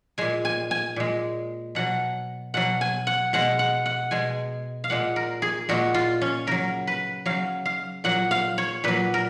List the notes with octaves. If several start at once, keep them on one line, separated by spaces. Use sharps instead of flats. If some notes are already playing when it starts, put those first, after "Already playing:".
A#2 G#3 G#5
G#5
G#5
A#2 G#3
B2 F#3 F#5
B2 F#3 F#5
G#5
F#5
B2 G#3 F#5
F#5
F#5
B2 G#3 G#5
F5
A#2 G#3 F#5
A#4
G#4
A#2 G#3 F#4
F4
C#4
C#3 F#3 A#4
B4
C#3 F#3 F5
F5
A#2 F#3 F#5
F5
C#5
A#2 F#3 B4
A#4